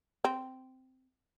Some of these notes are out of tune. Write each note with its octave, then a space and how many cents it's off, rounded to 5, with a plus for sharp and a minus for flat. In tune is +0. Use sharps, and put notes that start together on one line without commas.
C4 -10